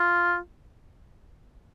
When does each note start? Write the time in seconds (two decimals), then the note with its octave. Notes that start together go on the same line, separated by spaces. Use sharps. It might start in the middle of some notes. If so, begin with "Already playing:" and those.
Already playing: F4